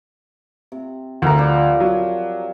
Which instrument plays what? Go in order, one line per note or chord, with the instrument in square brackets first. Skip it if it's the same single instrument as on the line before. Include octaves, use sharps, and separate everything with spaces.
[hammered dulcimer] C3
[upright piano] D2 A#5 [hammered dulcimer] A#4 F5 F#5
[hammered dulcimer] F3 G3 G4
[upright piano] F#3